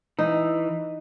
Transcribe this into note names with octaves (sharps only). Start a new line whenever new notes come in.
E3 D#4